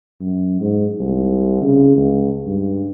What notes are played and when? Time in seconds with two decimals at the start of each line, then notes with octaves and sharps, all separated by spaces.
0.20 F#2
0.60 G#2
1.00 C2
1.62 C#3
1.97 C#2
2.46 G2